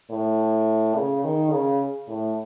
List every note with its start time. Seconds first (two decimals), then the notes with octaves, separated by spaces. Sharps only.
0.10 A2
0.95 C#3
1.23 D#3
1.51 C#3
2.08 A2